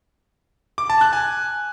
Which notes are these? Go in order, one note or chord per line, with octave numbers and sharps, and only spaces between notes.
D6
A5
F#6
G#5